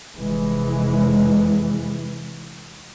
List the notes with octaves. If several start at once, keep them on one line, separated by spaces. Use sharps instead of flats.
F1 E3 G#3